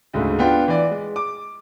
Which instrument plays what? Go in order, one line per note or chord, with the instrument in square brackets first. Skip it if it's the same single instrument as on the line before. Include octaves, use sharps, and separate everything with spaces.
[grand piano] D2 G#2 C#3 A3
B3 D4 F4 B4 F#5 G5
E3 D5
G#3
D6